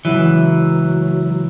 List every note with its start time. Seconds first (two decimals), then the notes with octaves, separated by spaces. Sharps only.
0.05 C#2 E3 F#3